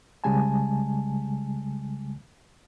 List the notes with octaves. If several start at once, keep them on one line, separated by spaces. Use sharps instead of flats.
C2 C#3 G3 G#3 G#5 A5